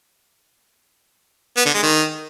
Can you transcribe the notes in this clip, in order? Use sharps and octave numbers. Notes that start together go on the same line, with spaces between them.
B3
D3
G#3
D#3